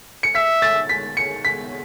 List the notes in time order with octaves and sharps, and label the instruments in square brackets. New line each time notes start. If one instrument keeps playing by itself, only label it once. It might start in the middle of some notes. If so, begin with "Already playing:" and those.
[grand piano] C#7
[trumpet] E5 [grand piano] B6
[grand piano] A6
B6
C#7
B6